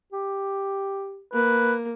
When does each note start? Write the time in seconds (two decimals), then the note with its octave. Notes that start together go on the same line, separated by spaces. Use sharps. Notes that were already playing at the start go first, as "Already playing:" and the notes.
0.12 G4
1.33 A#3 B4